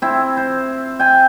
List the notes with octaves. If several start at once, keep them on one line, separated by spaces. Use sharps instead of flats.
C4 E4
C5
G5 G#5